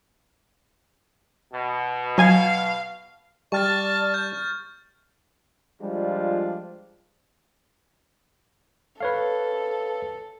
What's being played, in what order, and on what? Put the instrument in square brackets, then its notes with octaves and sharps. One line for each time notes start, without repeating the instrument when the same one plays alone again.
[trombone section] B2
[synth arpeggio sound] F#3 G#5 G#6 [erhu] F5
[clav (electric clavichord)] G3 [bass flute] D5 [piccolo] A5 [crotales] C#6 F6 A6
[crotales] G6
[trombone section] F3 G3 G#3 D4 F4
[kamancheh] A4 [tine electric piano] B4 C#5 F5